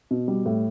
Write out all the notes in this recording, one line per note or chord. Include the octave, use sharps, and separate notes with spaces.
B2
G3
A2